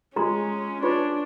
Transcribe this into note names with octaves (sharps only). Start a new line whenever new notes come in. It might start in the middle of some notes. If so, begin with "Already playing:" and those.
G#3 C#4 F4 A#5 C6
D4 F4 B4 C#5 C6